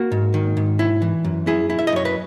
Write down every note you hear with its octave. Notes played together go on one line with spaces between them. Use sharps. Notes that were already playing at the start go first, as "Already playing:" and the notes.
Already playing: A#3 F#4
G#2
D#3
G#2
E4
E3
F#2
E4 G#4
E4
E5
D#5
F#2 C#5
B4